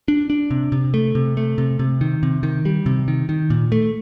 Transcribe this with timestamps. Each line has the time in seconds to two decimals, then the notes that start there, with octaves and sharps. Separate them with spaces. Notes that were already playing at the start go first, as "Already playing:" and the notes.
0.08 D4
0.30 D4
0.51 C3
0.72 C3
0.94 A3
1.15 C3
1.37 A3
1.58 C3
1.79 C3
2.01 D#3
2.23 C3
2.43 D#3
2.65 G3
2.86 C3
3.08 D#3
3.29 D#3
3.50 A#2
3.72 A3